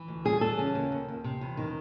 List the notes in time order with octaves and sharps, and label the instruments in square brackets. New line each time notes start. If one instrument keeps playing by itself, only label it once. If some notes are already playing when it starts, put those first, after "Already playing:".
Already playing: [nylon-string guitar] E3
D2
G3 G#4
E3 A4
C#3
D#2
D#2
D#2
C3
E2
D#3